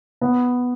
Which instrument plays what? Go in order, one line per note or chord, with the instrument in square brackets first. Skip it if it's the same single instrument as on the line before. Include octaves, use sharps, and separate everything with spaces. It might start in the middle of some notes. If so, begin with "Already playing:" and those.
[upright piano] B3